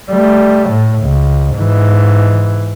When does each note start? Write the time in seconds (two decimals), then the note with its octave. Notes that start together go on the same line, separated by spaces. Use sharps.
0.11 G3 A3
0.69 A2
1.03 C#2
1.55 G#2 E3